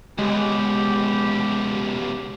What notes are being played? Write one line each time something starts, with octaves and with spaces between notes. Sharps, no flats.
C#2 B2 G#3 G4